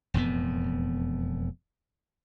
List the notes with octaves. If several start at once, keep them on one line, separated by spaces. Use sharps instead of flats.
E1 F2 A2 B3